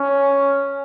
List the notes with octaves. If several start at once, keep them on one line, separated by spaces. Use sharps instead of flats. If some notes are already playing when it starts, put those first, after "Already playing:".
Already playing: C#4